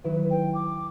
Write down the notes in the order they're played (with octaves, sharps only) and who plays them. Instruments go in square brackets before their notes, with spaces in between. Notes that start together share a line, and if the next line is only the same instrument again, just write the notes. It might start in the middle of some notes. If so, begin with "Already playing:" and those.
[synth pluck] D#3 F#3 E4 [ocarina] B4
[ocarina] G5
D6